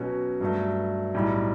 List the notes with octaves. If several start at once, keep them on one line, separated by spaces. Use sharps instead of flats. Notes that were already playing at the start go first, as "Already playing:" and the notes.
Already playing: B2 F#3 C#4 F#4
G2 F#3 A3
B1 A2 G3